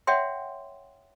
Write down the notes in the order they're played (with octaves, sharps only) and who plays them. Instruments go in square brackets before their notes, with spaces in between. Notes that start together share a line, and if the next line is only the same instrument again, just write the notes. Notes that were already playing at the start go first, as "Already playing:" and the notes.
[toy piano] C#5 E5 F#5 G5 C6